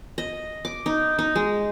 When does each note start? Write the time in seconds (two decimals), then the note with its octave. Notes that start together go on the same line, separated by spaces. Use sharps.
0.18 D#5
0.65 D6
0.86 D#4
1.19 D#4
1.36 G#3